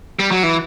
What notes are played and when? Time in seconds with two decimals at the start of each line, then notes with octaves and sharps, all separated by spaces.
0.19 G3
0.31 F#3
0.43 E3